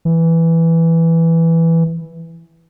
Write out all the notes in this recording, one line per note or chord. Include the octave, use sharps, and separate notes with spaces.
E3